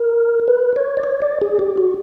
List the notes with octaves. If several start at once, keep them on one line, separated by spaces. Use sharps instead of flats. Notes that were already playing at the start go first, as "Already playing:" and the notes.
Already playing: A#4
B4
C#5
D5
C#5
D5
G#4
G4
F#4